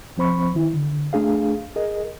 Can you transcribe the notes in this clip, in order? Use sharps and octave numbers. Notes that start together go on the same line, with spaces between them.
C2 F3 C4 C5 B5 C#6
D#3 E4
D3
A3 D4 G#4 F5
G#4 A#4 D#5